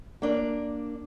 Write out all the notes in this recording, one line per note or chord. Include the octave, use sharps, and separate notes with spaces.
A#3 D4 D5